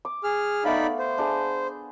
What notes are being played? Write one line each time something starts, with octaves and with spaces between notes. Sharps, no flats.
D6
G#4 F6
A3 B3 D#4 D5 F5 B5
C5
D4 G#4